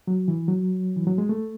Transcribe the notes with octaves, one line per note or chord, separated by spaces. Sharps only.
F#3
E3
F#3
E3
F#3
G#3
A3